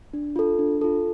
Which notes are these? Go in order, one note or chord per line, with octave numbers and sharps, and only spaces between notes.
D4
F4 A4
D4
F4 A4